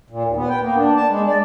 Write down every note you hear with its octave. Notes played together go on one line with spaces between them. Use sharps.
A#2
D#2
B3
G5
A#3
D4
A5
G#3
D5